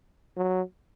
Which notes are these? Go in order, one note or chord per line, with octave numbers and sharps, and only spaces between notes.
F#3